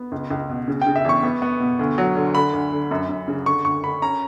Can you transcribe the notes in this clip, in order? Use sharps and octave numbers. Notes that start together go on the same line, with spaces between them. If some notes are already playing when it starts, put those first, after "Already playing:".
Already playing: B3
C#2
C#2
B2
C#3
G5
C#3
E5
E2 C#6
B3
B3
B2
D2
F#3
D3
D3 B5
D2
D3
F#2
F#2
C#3
D3 C#6
D2 C#6
D2 B5
C#4 A#5